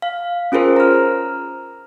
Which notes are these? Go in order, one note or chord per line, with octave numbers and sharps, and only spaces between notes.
F5
C#4 F4 G#4 A#4 C5
A#5 F6